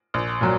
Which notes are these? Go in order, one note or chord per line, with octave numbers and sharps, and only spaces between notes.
A#1
A#2 F#3